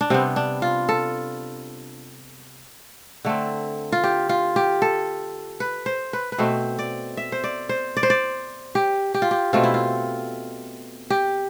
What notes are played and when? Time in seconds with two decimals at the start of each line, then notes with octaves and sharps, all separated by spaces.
0.01 D4
0.10 C3 G3 B3 C4
0.36 D4
0.62 F4
0.89 A4
3.25 D3 A3 C4
3.92 F4
4.04 G4
4.29 F4
4.56 G4
4.82 A4
5.60 B4
5.86 C5
6.13 B4
6.32 B4
6.38 B2 A3 C4 C5
6.79 D5
7.17 E5
7.32 C5
7.44 D5
7.69 C5
7.97 D5
8.03 C5
8.10 D5
8.75 G4
9.14 G4
9.22 F4
9.31 G4
9.53 B2 A3 C4 F4
9.63 E4
9.74 F4
11.10 G4